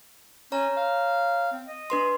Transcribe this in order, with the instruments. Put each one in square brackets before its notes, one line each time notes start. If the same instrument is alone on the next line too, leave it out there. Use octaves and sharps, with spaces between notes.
[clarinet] C#4 [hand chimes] C#5 A#5
[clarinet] F5
C4
D#5
[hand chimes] D4 B4 C6